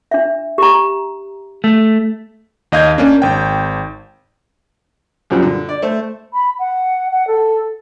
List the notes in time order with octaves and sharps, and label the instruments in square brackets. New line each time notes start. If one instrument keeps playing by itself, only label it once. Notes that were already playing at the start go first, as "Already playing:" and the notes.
[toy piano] D4 E5
G4 A#5
[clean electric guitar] A3
[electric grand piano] D#2 D#5 F5 G6 G#6
A#3 C#4 D4
G#1 G5
[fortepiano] F#2 A#2 F3 G3
D3
D5
A3 C5
[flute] B5
F#5
F#5
A4